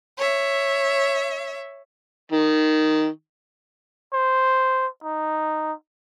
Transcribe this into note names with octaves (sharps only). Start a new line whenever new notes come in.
C#5 E5
D#3
C5
D#4